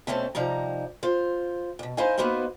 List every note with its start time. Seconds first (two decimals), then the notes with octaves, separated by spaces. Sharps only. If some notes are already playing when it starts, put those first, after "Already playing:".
0.07 B2 A3 C4 C#4 A4
0.35 C3 F3 G3 D#4 A#5
1.03 F4 C5
1.79 D2 B2
1.97 D#4 E4 C5 D#5 F5 G#5
2.18 A#3 B3 D#4 F#4 B4 C5